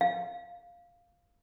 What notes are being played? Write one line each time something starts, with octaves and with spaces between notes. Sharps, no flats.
F5